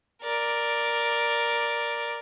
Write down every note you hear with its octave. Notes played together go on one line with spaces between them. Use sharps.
A#4 D5